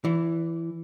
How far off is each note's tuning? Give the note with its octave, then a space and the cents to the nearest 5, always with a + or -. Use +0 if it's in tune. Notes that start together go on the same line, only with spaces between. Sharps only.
E3 +10 D5 -35